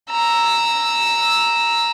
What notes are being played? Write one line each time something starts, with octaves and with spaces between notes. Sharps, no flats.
A#5 E6